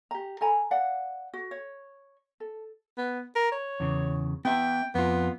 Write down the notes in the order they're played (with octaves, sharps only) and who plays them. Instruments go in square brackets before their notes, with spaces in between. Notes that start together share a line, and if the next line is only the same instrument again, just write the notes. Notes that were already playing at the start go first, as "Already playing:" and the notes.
[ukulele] G4 A#5
A4 G#5 A#5 B5
D5 F5 F#5
F#4
C#5
A4
[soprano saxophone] B3
A#4
C#5
[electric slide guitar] E2 C#3
[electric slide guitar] B3 E5 [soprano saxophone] G5
[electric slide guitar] F2 F4 [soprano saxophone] B3